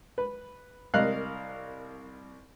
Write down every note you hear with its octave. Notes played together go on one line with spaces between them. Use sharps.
B4
C2 A#4 D#5 F5 F#6